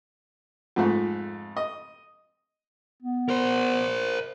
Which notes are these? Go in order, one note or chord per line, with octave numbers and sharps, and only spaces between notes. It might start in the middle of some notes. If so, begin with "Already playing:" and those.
F2 G#2 A3
D#5
B3
A#4 C5